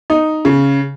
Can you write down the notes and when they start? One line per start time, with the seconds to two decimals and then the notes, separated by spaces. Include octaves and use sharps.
0.10 D#4
0.45 C#3